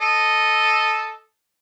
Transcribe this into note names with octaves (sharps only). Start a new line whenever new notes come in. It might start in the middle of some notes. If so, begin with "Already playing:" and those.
A4 D#5